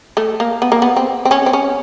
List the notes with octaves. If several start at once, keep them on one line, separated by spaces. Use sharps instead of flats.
A3
A#3
B3
A#3
B3
C4
C4
C#4
C4
C#4